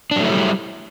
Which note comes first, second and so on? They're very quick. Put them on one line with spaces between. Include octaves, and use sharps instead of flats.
D4 F#3 A3 E4 G3